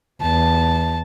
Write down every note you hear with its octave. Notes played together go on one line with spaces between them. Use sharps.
E2 A5